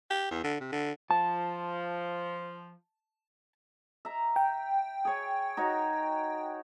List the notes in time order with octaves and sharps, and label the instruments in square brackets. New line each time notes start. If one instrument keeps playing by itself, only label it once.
[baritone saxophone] G4
E2
D3
C3
D3
[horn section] F3 [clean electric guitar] A5
[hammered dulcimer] E5 A#5
[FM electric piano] G5
[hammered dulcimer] G#4 C#5
D#4 F#4 C#5